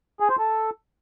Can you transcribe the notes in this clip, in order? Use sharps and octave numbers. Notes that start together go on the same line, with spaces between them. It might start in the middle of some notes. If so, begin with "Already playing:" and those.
G#4
C5
A4